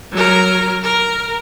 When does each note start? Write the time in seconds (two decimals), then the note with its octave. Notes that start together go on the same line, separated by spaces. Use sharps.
0.12 F#3 A#4
0.83 A#4